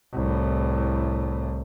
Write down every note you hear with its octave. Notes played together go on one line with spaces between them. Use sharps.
C2 A2